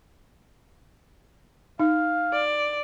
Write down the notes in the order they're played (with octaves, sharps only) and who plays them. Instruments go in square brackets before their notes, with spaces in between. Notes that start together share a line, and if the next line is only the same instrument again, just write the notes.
[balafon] D#4 [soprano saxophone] F5
[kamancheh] D5